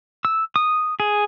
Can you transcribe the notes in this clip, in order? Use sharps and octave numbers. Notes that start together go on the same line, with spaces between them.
E6
D#6
G#4